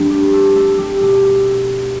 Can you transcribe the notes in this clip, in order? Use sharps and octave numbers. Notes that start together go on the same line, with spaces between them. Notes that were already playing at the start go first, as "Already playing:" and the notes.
Already playing: G2 F3 A3 C4 D4
G3 G4
A3 A4
A3 A4
G3 G4
B2 A3